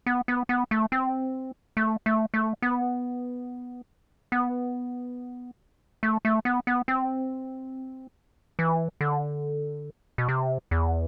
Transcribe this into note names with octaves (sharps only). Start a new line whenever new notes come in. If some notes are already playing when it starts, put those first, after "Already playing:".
B3
B3
B3
A3
C4
A3
A3
A3
B3
B3
A3
A3
B3
B3
C4
E3
D3
B2
C3
E2